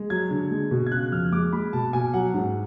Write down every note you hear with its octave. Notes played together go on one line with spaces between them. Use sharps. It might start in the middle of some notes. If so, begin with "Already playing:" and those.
Already playing: G#3
F#3 G#6
D3
G#3
B2
G#6
C#3 F#6
F2 F6
G#3 D6
G#3 B5
B2 A5
B2 G#5
F#3 F#5
G#2